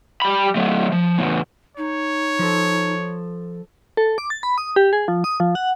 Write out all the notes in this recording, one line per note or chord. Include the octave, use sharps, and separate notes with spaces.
G3 B5
F#3 A3
F3
E2 A2
D#4 C#5
F3 A4
A4
D6
A6
B5
D#6
G4
G#4
F3
D#6
F3
F#5